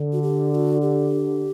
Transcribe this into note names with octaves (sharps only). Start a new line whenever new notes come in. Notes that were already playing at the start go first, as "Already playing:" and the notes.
Already playing: D3
F#4
G4
G4
F#4
G4